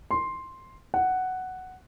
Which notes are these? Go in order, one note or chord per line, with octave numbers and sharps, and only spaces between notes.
C6
F#5